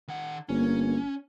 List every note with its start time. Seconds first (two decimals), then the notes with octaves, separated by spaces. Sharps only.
0.08 D#3 F#5
0.49 G1 A#3 C#4